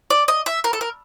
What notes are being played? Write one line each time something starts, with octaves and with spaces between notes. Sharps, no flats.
D5
D#5
E5
A#4
A4
A#4